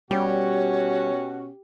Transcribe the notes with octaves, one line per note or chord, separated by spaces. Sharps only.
B2 G3 C#4 F#4 G4 C#5